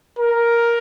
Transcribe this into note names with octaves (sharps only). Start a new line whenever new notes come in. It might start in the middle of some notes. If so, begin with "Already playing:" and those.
A#4